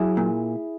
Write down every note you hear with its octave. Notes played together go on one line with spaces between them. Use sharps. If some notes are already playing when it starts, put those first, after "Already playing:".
Already playing: F#3 E4 G#4
A#2